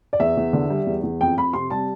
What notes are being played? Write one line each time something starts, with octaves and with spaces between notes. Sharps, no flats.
D5
E2 E5
E2
D3
G3
E2
E2
F2 G5
F2 B5
C3 C6
G3 A5